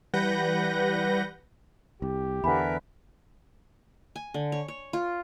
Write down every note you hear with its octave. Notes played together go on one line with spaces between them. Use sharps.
E3 G3 B4 F#5 G6 A#6
C2 G4
E2 D3 A#4 B4 E5 F#5 G#5 B5
G#5
D3
C#5
C#5
F4